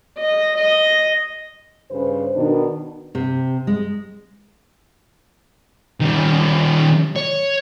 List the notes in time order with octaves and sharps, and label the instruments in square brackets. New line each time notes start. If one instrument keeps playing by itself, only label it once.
[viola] D#5
D#5
[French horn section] G2 C#3 B4 C5
B2 D#3 D4
[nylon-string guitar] C3
G#3
[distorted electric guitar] D#3 G3
C#5